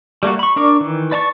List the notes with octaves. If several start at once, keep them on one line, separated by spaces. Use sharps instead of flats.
G3 A3 A#3 F#4
B5 C#6
D4 A#4 D5 C#6
D#3 E3
B4 D5 A5 A#5 C#6